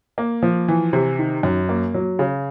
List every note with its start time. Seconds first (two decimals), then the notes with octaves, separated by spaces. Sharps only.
0.18 A#3
0.42 F3
0.68 E3
0.93 C3
1.19 D#3
1.43 F#2
1.69 A#3
1.94 F#3
2.19 C#3